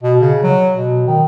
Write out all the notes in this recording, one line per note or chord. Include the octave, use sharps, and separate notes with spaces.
B2
C#3
F#3
B2
D#3